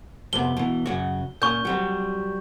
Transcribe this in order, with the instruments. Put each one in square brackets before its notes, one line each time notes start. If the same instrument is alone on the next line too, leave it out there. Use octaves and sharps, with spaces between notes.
[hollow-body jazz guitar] F2 C3 B3 [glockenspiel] G7
[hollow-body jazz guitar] B2 E3
F#2 C#3 F#4
[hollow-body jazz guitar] A#2 C#4 [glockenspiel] C#6 G6
[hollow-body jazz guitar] F#3 G3 C4